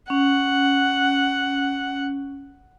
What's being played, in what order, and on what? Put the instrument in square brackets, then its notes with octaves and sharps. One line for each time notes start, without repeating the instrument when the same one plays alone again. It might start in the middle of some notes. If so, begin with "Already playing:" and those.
[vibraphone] C#4 [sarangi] F#5